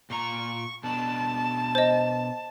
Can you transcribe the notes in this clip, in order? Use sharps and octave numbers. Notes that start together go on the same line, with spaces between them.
A#2 A#5 C#6
B2 D4 A5
C5 D#5